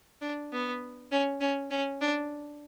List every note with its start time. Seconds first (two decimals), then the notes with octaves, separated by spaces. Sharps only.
0.22 D4
0.52 B3
1.12 C#4
1.41 C#4
1.71 C#4
2.01 D4